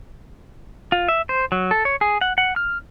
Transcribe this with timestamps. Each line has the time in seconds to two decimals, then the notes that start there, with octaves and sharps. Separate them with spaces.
0.92 F4
1.08 E5
1.29 C5
1.52 F#3
1.71 A4
1.85 C#5
2.01 G#4
2.21 F#5
2.38 F#5
2.56 F6